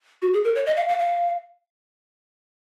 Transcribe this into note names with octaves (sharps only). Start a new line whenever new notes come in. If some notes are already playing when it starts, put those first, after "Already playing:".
F#4
G#4
A#4
C#5
D#5
F5
F5
F5